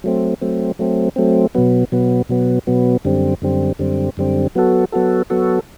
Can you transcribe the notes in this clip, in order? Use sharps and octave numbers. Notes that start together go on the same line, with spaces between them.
F#3 A3 C4
F#3 A3 C4
F#3 A3 C4
F#3 A3 C4
B2 F#3 B3
B2 F#3 B3
B2 F#3 B3
B2 F#3 B3
F#2 D3 G3 C4
F#2 D3 G3 C4
F#2 D3 G3 C4
F#2 D3 G3 C4
F#3 B3 F#4 A4
F#3 B3 F#4 A4
F#3 B3 F#4 A4